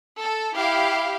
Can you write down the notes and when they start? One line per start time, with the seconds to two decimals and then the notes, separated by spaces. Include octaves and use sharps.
0.20 A4
0.55 E4 G4 F5